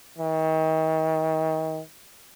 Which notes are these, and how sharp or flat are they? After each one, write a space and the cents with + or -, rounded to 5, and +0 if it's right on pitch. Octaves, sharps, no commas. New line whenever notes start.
D#3 +35